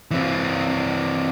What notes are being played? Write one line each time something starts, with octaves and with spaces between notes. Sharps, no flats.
E3 C4